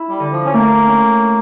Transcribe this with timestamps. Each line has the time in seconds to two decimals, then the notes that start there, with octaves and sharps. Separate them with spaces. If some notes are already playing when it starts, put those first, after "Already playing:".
Already playing: E4
0.09 G3
0.20 D3
0.31 F3
0.45 C#4
0.53 A3 A#3
0.87 C#4